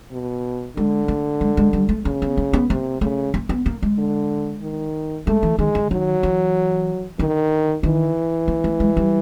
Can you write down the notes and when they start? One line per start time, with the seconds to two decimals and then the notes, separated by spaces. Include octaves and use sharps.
0.12 B2
0.76 D3 G#3
1.08 A3
1.41 G#3
1.57 G#3
1.73 G3
1.89 A3
2.05 C#3 A#3
2.22 B3
2.37 A#3
2.53 B3
2.70 C3 A#3
3.01 C#3 A3
3.34 A#3
3.49 B3
3.66 A#3
3.82 G#3
3.98 D3
4.62 D#3
5.27 G#3 A3
5.43 E3
5.59 D#3 G#3
5.75 D3
5.91 D#3 F#3
6.23 E3
7.19 D3 D#3
7.83 D#3 E3
8.48 A#3
8.64 A3
8.80 G#3
8.97 G3